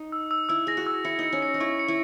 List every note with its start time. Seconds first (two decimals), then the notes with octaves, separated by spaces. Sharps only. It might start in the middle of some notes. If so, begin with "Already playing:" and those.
Already playing: D#4
0.12 E6
0.31 E6
0.49 E4 E6
0.67 G#4 A#6
0.77 F#4
0.87 E6
1.05 E4 C#7
1.19 D#4 C#7
1.33 C#4
1.42 C#7
1.54 D#4
1.60 E4 C#6
1.79 C#7
1.88 E4